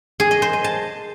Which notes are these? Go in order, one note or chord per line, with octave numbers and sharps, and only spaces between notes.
G#4
D#5
C5
D#5
A5